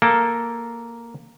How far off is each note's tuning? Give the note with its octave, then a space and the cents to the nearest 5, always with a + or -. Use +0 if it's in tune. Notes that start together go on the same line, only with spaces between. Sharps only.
A#3 +0 A4 +0